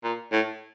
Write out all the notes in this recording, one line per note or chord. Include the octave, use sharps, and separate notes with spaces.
A#2
A2